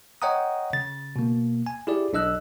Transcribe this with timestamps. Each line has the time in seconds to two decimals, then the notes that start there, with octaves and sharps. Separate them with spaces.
0.22 C#5 D#5 F#5 G5 A#5 D#6
0.73 C#3 A6
1.16 B2 A#3
1.66 G#5
1.87 E4 G4 G#4 D5
2.13 B1 D4 D#5 E6 F#6